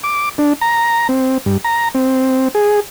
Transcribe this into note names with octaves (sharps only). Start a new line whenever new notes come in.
D6
D4
A#5
C4
G2
A#5
C4
G#4